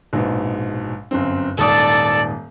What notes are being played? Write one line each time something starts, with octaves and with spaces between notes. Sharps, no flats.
A#1 G#2 B2
G1 F#2 C4
D#1 G#2 A4 D5 D#6